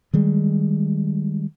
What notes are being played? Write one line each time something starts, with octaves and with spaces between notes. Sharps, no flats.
D#3 G3 G#3